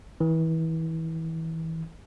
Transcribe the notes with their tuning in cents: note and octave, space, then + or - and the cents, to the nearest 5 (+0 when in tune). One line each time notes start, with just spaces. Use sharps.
E3 -30